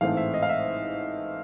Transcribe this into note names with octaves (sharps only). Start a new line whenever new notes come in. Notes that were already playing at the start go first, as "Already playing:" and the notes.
A1 G#2 E3 A3 C4 F5
E5
D#5
F5
E5